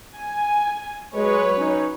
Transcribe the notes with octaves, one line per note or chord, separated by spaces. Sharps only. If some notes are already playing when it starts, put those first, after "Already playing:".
G#5
F#3 G#3 B4 C#5
C#4 D#4